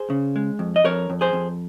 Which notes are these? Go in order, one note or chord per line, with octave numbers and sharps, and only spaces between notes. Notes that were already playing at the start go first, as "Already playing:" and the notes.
Already playing: G#4 C5
C#3
G#3
F2
D#5
F2 A#4 C#5
F2
G#4 C5
F2